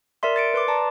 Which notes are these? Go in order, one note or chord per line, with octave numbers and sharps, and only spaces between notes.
A#4 D5 E5 C6
A6 C#7 D7
B4 C6 D6
B4 D5 A5 A#5